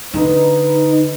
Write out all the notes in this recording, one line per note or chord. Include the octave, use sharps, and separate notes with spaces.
D3 D#4 B4